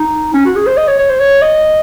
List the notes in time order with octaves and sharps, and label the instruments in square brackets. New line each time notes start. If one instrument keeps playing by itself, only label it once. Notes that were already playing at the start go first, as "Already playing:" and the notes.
Already playing: [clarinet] D#4
C#4
F#4
G#4
C5
D#5
C#5
C#5
C5
C#5
D#5